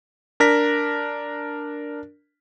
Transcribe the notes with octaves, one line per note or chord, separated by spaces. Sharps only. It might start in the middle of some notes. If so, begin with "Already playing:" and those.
D4 A#4 A#6 B6